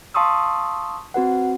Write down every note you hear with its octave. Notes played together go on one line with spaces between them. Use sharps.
F5 A5 C6 C#6 D#6 E6
C4 F#4 B4 F#5